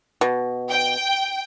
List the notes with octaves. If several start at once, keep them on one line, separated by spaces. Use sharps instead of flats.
B2
G5